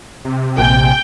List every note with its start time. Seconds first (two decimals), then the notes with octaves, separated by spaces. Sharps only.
0.25 C3
0.58 A#1 A#2 G5 G#5